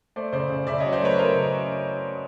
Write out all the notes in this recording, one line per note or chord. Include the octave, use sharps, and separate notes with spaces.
A3 C5 D5
C#3 C5 D5
C#3
C#3 D5 E5
F#3 C#5 D#5
C5 D5
A3 B4 C#5
A3 A#4 C5
C#3